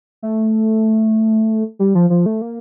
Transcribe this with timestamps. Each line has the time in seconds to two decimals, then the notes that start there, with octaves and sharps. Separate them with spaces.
0.22 A3
1.79 G3
1.95 F3
2.10 F3
2.26 A3
2.42 A#3